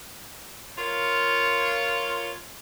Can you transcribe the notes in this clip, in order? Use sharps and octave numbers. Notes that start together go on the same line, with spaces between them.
F4 A#4 C#5